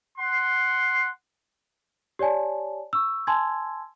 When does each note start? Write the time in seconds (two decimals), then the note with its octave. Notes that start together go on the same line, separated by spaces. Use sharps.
0.17 F#5 C6
2.19 G4 C#5 D5 G#5 A5
2.93 C#6 E6
3.27 G#5 A5 C6 E6 G#6